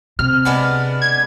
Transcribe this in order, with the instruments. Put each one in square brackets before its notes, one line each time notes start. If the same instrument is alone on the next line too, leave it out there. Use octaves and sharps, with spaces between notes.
[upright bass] C3 [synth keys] F6
[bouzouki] G#3 B3 D4
[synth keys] G#6